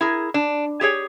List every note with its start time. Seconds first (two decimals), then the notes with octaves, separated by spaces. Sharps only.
0.01 E4 G#4 A#4
0.34 D4
0.81 G4 G#4 C#5